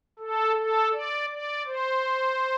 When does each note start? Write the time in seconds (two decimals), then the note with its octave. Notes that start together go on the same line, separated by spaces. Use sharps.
0.19 A4
0.56 A4
0.92 D5
1.30 D5
1.66 C5